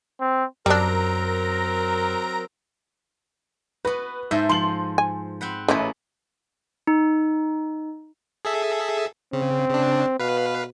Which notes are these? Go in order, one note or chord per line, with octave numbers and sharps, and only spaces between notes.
C4
F#2 F#3 G3 C4 D4 A#4 A#5
B3 F#4 B4
G#2 A4 C5 E5
F3 C6 F#7
G#5
C4 F#5 B5
A1 A3 A#3 C#4 E4 B4
D#4
G#4 A4 E5
C#3 C4
C#3 D4
B2 B4 F5